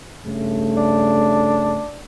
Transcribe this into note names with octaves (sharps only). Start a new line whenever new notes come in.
G2 C#3 A3
D4